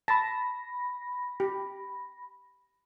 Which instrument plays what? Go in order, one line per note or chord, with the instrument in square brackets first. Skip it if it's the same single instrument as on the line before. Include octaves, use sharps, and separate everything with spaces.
[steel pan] A5 [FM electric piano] B5 A#6
[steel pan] G4